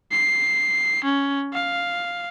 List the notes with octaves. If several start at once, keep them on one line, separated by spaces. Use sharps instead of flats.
C7
C#4
F5